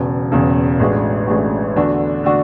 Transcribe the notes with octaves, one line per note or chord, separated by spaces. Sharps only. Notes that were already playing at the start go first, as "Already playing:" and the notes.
Already playing: E1 E2 C#3
E1 E2 C#3
A1 A2 G#3 D4 F#4
A1 A2 G#3 D4 F#4
E2 D3 A3 D4 F#4
D3 A3 D4 F#4